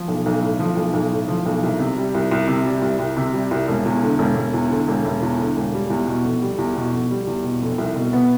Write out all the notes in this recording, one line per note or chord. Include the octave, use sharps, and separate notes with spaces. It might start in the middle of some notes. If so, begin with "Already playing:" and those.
Already playing: F3
B1
B1
A2
F3
B1
B1
A2
F3
B1
C2
C3
G3
C2
C2
C3
G3
C2
C2
C3
G3
C2
E1
E2
D3
E1
E1
E2
D3
E1
E1
E2
D3
E1
G3
E2
B2
F1
G3
E2
B2
F1
G3
E2
B2
F1
C2
B2
B3